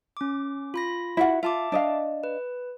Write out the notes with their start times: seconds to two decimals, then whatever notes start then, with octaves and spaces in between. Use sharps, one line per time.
0.17 C#4 D6
0.74 F4 B5 A#6
1.17 E4 F#4 F#5
1.43 F4 E5 A5 D6
1.72 D4 D#5 F5
2.24 B4